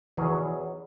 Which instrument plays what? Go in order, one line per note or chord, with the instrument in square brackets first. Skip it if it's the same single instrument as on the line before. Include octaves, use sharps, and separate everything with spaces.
[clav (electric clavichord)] E2 B2 F#3 C#4 G#4 [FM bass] E3